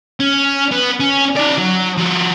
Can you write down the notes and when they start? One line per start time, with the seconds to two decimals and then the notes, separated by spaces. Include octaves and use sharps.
0.20 C#4
0.72 B3
1.00 C#4
1.36 D#4 D5
1.57 F#3
1.97 F3 F#4